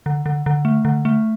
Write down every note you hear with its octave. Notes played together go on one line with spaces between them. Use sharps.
D3
D3
D3
A3
D3
A3